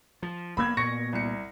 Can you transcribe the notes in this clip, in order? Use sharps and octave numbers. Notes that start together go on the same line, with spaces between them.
F3
F1 A#3 B3 B5 E6 G#6
A#2 B3 C#6 A#6 C#7
C2 C#7